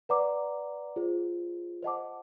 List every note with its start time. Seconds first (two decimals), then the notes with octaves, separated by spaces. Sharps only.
0.09 B4 D5 F#5 A#5 D6
0.96 F4 G#4 C5
1.83 C5 D#5 F#5 A5 D6